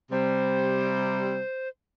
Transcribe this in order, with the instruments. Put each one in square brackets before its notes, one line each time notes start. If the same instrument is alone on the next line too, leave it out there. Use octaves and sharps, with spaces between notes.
[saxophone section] C3 G3 [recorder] C5